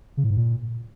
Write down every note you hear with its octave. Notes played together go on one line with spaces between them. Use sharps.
C#3
A2
G#2
A#2